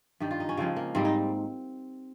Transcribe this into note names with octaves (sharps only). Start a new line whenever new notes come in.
G2 D#3 G3 G4
F4
D#4
C#4
C#3 F3 G#3 C4
A#3
G#2 G3 A#3 C4
D#4